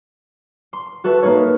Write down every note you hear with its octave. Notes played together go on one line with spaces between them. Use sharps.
C6
F#4 A4 B4 E5
A#3 D#4 B4 C#5